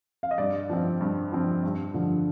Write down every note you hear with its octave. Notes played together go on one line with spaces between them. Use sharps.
F5
D#5
G2 D5
F3 C4
G2
F3 C4
G2
D3 F3